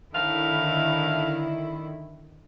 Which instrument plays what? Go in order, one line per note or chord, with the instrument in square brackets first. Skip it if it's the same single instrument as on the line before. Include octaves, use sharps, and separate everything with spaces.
[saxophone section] A2 A#4 F5 [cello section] D3 D#3 E4